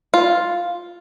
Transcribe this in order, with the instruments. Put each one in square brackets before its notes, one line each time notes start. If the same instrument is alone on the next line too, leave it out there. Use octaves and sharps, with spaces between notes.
[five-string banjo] F4